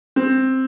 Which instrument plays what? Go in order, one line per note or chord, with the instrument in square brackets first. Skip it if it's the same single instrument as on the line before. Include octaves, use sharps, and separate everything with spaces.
[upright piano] C4